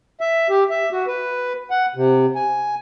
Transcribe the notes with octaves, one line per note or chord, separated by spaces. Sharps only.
E5
G4
E5
F#4
B4
F#5
C3
G#5